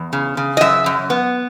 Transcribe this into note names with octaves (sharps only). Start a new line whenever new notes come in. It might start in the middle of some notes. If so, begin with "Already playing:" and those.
Already playing: E2
C#3
C#3
D#5
F#2 E5
F#2
B3